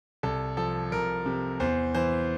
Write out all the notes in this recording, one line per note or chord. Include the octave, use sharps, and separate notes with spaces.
C2 A4
F3 A4
C2 A#4
C3
E2 C5
E3 C5